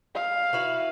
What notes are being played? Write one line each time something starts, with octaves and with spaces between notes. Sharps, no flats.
F5
E4 F#4 B4